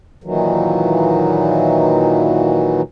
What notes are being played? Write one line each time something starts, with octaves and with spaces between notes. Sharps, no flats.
A#2 D#3 E3 F#3